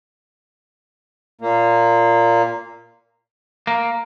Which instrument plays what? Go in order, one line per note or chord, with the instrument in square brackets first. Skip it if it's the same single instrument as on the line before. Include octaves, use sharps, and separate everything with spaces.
[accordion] A#2 A#3
[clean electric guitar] A#3